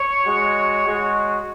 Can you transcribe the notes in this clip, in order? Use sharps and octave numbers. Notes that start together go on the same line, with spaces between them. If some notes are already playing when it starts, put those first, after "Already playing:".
Already playing: C#5
G#3 F#4
G#3 F#4